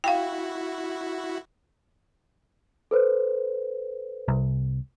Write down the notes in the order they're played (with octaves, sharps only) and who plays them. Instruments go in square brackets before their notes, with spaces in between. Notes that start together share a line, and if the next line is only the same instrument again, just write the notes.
[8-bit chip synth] E4 F#4 [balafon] F5 G5
[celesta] A4 B4 C5
[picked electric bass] C2